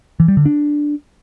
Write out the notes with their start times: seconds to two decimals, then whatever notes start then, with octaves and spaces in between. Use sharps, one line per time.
0.20 E3
0.28 G3
0.37 D3
0.46 D4